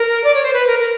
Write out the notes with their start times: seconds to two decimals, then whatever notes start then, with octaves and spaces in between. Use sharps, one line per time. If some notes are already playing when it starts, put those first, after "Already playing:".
Already playing: A#4
0.24 D5
0.34 C#5
0.43 C5
0.53 B4
0.67 A#4
0.79 A#4